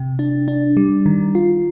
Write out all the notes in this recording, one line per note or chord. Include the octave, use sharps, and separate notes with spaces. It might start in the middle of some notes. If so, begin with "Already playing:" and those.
Already playing: C3
D4
D4
G3
D#3
F4